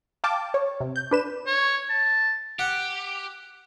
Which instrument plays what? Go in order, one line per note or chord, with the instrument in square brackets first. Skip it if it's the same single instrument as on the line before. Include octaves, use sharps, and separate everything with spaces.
[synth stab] F5 G5 A5 D6
C#5
C3
G6
D4 B4 E7
[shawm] C#5
A5
[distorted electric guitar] G4 [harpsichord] F#5